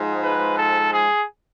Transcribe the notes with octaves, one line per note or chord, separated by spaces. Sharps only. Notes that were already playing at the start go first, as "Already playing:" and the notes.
Already playing: G#2 F3 G#3
B4
A4
G#4